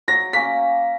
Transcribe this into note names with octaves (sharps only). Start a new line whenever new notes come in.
F#3 A#6
A#3 C#4 B6